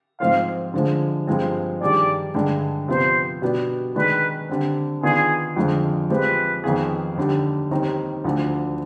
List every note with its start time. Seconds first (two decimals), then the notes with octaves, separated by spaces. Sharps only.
0.20 G#2 F3 C4 F4 C5 F5
0.74 D3 F3 G#3
1.27 G2 F3 G#3 C4
1.80 G2 D#3 G3 D4 G#4 D5
2.34 G2 D3 G#3 D4
2.88 C3 F3 B3 C5
3.42 B2 G3 B3 D4 G4
3.96 D#3 G#3 D4 B4
4.49 D3 G3 C4
5.03 D#3 B3 D4 F4 G#4
5.56 F2 D3 F3 G#3
6.10 F3 G#3 C4 G4 B4
6.64 F2 D#3 B3 F4 G#4
7.17 D#2 D3 G3
7.71 D#2 D#3 G3 C4 D#4
8.24 D2 D3 F3